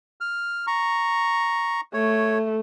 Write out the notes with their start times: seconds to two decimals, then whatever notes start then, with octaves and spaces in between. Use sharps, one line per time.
0.21 F6
0.67 A#5 C#6
1.94 A3 C#5